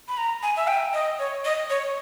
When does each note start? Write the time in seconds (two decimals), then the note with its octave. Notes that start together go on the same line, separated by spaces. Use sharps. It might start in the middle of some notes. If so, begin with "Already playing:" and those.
0.08 B5
0.17 A#5
0.43 G#5
0.56 E5
0.67 G5
0.93 D#5
1.19 C#5
1.45 D#5
1.70 C#5